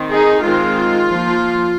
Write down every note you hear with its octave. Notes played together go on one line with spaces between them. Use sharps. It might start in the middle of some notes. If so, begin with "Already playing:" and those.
Already playing: D#3 C4
D#4 G#4
D#3 G#3 C4 F4
F3 A#3